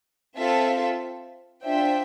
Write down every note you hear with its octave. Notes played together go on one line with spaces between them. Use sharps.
C4 F4 A4 E5
D4 F4 C5 E5 G5